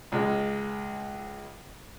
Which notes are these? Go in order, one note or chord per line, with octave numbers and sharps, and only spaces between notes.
C#2 G#3